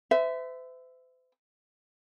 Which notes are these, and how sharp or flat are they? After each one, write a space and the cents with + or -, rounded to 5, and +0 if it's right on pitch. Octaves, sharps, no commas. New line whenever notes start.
C5 -45 E5 +0